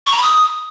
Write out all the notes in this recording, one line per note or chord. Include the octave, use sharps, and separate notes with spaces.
C#6
A#5
B5
D#6